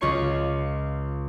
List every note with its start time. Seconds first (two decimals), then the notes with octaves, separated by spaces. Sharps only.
0.01 C#2 F4 C#5 C#6 C#7